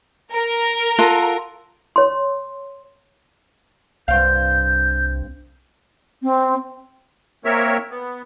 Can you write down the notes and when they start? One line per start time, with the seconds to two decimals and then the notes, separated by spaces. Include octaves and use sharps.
0.33 A#4
0.99 F4 A4 F#5
1.96 C#5 C6
4.08 C2 G2 C4 F5 G6
6.23 C4
7.45 A#3 C4 A#4 C#5 E5
7.90 B3